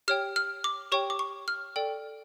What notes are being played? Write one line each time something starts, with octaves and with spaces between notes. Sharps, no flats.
G4 C#5 G5 F6
F6
D6
G4 C#5 G5 C#6
D6
C#6
F6
A4 D5 G5